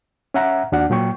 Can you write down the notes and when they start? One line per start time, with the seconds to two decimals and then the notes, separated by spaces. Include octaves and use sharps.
0.34 C#4 E5 F#5 A#5
0.72 D#2 D4 F#4 F#5
0.90 A#2 F#3 G5 C#6